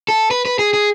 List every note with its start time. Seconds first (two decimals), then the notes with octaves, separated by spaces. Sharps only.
0.08 A4
0.31 B4
0.45 B4
0.59 G#4
0.74 G#4